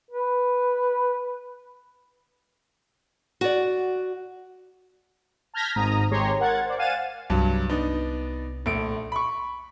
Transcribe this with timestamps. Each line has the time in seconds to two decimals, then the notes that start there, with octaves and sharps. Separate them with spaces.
0.11 B4
3.41 F#4 D5
5.54 A5 F6 G6 G#6 A#6 B6
5.76 G#1 G#2 A#5 D#6
6.11 G#1 G#3 G4 C#5 A#5 C6
6.40 A#4 F#5 G#6 A6
6.66 C5 D5
6.78 F5 F#5 G#5 A6 D#7 E7
7.30 C2 G2 F#3
7.69 B3 D4 D#4
8.66 A#1 A3 D7
9.12 B5 C#6